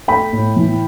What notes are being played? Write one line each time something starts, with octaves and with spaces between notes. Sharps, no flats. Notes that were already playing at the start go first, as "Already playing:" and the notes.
A3 G5 B5
A2
E3